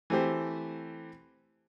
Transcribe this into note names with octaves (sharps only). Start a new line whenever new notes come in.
E3 A3 C4 G4 C5